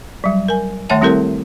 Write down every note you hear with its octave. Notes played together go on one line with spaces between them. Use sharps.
F#3 G3
A#4 G#5
D#3 A3 C#5 E5 F#5 A5
G3 C4 E4 G4 A4 A#4